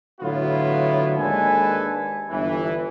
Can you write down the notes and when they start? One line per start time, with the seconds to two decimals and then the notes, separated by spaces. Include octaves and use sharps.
0.21 A2 D3 F#3 B3 E4 F4
1.17 D#2 G#3 D4 A4 B4 G#5
2.30 G1 E3